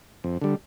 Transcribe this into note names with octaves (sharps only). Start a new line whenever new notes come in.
F2
D3 G3